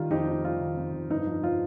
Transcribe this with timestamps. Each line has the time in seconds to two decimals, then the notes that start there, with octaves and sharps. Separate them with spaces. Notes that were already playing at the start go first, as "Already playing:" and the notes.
Already playing: D#3 G3 F4
0.10 F2 D#4 G4
0.28 F2
0.44 G3 F4
0.60 D#3
0.77 F2
0.93 F2
1.10 G2 D#4
1.27 F3
1.43 F3 F4